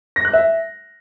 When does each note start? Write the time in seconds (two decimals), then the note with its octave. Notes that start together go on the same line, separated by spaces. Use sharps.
0.16 A#6
0.25 F#6
0.33 E5